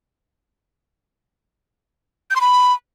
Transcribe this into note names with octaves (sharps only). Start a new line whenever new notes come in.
G6
C6
B5